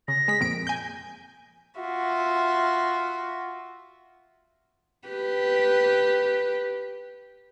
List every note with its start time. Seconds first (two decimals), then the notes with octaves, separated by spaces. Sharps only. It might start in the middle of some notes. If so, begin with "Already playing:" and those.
0.08 C#3 A#6
0.28 G#3 B6
0.40 F2 A#2 D7
0.67 G#5 G6
1.79 F4 F#4 E5
5.08 G4 B4